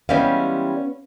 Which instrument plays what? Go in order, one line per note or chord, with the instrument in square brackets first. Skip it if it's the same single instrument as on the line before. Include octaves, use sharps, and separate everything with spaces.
[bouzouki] E3 G3 G#3 [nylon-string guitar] B3 C#4 F5